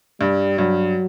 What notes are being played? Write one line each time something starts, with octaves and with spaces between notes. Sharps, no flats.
G2 G3
G2 F#3